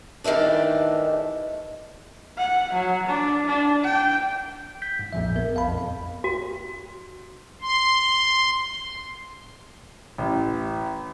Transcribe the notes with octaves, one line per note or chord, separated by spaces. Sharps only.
G2 D#3 E3 A3 D4
F#5
F#3
D4
D4
G5
G6 B6
G#2
A#1 F2 A#2 F3 E5
B3 A#4
A#1 F5 A5 B5
F2 A#2
F#4
C6
A1